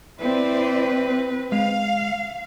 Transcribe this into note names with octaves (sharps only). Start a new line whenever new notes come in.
C4 E4 B4 C5 D5
G#3 F5